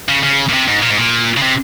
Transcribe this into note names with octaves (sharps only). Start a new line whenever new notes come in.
C#3
C#3
A#2
C3
G#2
A#2
G#2
A#2
C#3
C3